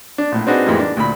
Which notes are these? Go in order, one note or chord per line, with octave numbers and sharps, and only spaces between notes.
D4
A#1 A2
C4 D4 D#4 F#4 G#4 B4
F2 A2 E3 G3 G#3 A#3
D4
D2 A#2 B5